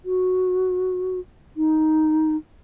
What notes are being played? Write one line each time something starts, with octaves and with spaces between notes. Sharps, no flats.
F#4
D#4